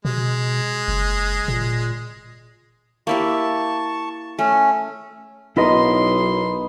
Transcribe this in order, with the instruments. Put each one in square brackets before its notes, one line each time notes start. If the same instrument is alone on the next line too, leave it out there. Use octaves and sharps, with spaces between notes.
[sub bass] B2 [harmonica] G#3
[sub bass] F#1
A#2
[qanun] A#3 E4 G4 [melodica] A5 C#6
[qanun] A3 [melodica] C#4
[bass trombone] B1 [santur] B3 D#4 [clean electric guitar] E4 A#4 D#5 [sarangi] C6